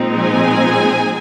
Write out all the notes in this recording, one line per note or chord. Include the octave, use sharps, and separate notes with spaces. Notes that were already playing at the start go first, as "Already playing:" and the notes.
Already playing: A#2 F3 G#3 C4 D#4
G#4 G#5